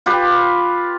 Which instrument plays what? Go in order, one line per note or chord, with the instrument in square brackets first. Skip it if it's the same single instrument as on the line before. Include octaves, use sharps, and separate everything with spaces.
[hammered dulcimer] F4 G4 B4